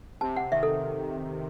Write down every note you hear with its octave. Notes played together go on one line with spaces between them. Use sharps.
C3 A5
F#5
D#3 E5
A4